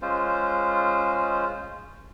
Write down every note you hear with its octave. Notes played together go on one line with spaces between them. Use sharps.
G#3 C#4 F4 C5